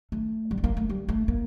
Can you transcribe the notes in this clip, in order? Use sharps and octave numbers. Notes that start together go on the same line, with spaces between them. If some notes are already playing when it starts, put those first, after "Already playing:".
A3
G3
A3
A#3
A3
G3
A3
A#3